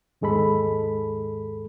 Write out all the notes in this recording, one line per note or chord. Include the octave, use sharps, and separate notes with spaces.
D#2 G#2 G#3 A4 B5